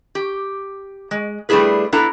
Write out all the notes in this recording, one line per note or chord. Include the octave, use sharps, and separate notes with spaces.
G4
G#3
G3 A3 D4 E4 G#4 B4
B3 D4 E4 A4 A#5